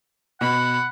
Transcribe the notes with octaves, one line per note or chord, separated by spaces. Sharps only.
B2 F#5 B5